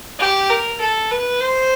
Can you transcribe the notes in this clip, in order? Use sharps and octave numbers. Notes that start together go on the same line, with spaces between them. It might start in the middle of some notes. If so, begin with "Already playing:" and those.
G4
A#4
A4
B4
C5